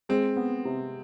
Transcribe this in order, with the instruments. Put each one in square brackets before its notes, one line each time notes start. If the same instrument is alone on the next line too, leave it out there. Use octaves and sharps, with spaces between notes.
[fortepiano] G#3 [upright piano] C4
[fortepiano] B3
C3